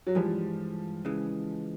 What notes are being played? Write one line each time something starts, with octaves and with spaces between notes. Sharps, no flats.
F#3
G2 E3 F3 G3 G#3
C#3 E3 G#3